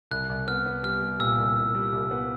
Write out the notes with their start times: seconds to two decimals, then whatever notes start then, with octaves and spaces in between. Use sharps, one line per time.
0.11 C2 F#6
0.29 C2
0.47 B3 F6
0.66 B3
0.83 G3 F6
1.02 G3
1.20 A#2 E6
1.38 C2
1.56 C2
1.75 G3
1.92 C2
2.11 B3